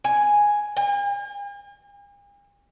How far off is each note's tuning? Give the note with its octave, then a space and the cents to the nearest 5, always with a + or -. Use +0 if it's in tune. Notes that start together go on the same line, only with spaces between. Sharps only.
G#5 +0
G#5 -45